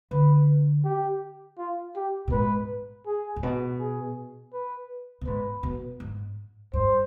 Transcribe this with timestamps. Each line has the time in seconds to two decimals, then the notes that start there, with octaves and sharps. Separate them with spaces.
0.11 D3 B4
0.85 G4
1.58 F4
1.96 G4
2.28 B2
2.32 G#2 B4
3.06 G#4
3.36 G#2
3.43 B2
3.80 G#4
4.53 B4
5.21 B2
5.26 G#2 B4
5.63 B2
6.00 G#2
6.73 G2 C5